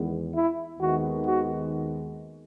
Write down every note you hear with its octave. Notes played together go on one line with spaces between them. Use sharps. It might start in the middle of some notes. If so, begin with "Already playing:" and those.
Already playing: E2 D#3 G#3 B3
E4
D#2 D#3 G#3 B3 F#4
F#4